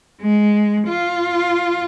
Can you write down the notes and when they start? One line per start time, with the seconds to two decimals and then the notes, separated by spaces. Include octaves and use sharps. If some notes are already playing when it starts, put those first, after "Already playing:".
0.22 G#3
0.88 F4